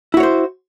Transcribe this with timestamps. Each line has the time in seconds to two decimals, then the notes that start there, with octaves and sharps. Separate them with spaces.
0.14 E4
0.17 F#4
0.20 C#5
0.23 C5